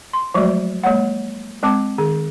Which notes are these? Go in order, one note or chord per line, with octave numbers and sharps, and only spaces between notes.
C6
F3 F#3 G#3 A3 F#4 D5
G#3 A#3 C#5 F#5
G#3 C4 A5 D6
D#3 G#4